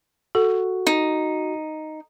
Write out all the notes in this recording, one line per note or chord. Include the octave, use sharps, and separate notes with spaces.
F#4 A4
D#4